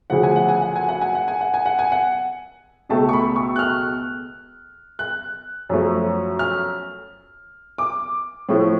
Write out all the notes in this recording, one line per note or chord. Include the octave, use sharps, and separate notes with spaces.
D2 C#3 F3 F#5
G#5
F#5
G#5
F#5
G#5
F#5
G#5
F#5
G#5
F#5
G#5
F#5
G#5
F#5
C#2 B2 A3 A5
C#6
B5
C#6
F#6
F6
F#6
F#2 F3 A3
F6
D6
A2 F3 A3